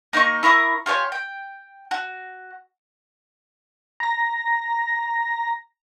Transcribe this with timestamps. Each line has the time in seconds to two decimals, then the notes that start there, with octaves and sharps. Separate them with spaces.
0.13 A#3 D#4 F5 C#6
0.43 E4 A#4 C#6 D#6
0.86 F4 G4 C#5 G#5
1.12 G5
1.91 F#4
4.00 A#5 A#6